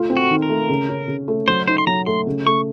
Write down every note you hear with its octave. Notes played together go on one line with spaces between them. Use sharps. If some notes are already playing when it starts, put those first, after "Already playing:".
Already playing: A3 F4
C4
F#4
D#3
A#4
A3
C#3
C#4
C#3
A3
F#3 C5
D#4 C5
C6
F#3 A#5
A3 C6
C#3
A3 C#6